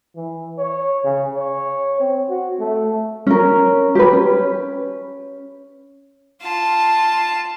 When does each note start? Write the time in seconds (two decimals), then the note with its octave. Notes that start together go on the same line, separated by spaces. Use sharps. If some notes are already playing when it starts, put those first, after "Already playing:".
0.16 E3
0.58 C#5
1.04 C#3
1.36 C#5
2.00 C4
2.30 F#4
2.60 A3
3.27 C#4 A#4
3.95 G4 B4
4.13 C#4
6.42 F4 A5